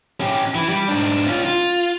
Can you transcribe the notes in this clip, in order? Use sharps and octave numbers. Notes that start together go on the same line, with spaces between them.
C#4 G4
E3
G3
G#2 D4
C#4 F4
F4